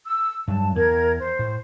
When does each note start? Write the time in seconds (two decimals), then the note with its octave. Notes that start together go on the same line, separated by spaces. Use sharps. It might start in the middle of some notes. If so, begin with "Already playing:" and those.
0.05 E6
0.48 G2 F#3 A5
0.75 E2 A#4 G#6
1.19 C5
1.39 A2